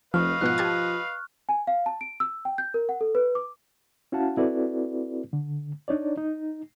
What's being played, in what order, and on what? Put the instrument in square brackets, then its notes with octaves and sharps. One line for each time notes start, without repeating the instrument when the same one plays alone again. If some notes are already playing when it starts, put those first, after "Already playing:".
[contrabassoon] F1 [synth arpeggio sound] F3 [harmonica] B4 D#5 F5 [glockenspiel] C#6 F6
[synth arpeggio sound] G#2 B2 F#5 [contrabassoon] F3 [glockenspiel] F#6
[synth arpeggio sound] G4 A5 G#6
[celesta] G#5
F5
A5
D7
E6
G5
G6
A#4
F#5
A4
B4
D6
[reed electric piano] C#4 E4 F#4 F5 F#5 A5
C4 E4 F#4 A4 B4 D5
D3
D4 D#4 C#5 D5
D#4